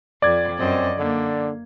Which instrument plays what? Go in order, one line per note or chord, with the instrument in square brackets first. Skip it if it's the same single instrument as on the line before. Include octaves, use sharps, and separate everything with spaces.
[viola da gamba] F2 [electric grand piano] D5 G#6
[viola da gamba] F#2 D#5 [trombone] C4
[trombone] D3 [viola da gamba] A#3